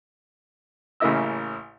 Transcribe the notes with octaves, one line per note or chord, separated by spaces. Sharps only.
A1 C#3 A#3 E4 D#5 E6